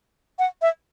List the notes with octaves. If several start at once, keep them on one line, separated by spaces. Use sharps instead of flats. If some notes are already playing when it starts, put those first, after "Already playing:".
F#5
E5